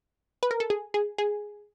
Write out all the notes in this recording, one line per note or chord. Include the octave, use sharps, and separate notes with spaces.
B4
A#4
A4
G#4
G#4
G#4